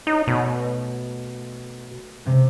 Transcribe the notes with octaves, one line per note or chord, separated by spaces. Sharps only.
D#4 C#5 D#5 D#6
B2 A3
C3 G#3